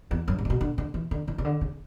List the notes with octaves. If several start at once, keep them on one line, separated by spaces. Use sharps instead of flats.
E2
F#2
G#2
C#3
B2
D3
D3
E3
D3
E3
C#3
D3
C#3